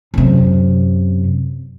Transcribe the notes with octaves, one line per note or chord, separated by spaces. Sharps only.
F#2 C3